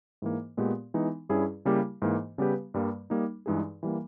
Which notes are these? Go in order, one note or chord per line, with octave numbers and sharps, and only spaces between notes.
G#2 E3 A#3
A#2 G#3 B3 G4
E3 G#3 B3 D#4
G2 G3 C#4 E4 G#4
C#3 G3 A#3 E4 G4
G#2 E3 A#3
C#3 G3 B3 G4 B4
G2 G3 A#3
G3 A#3 D#4
G2 E3 G#3 D#4 G#4
E3 G3 A#3